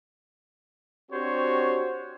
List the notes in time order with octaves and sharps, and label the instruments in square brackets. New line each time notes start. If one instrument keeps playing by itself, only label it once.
[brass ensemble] C4 D4 F#4 G4 C5 C#5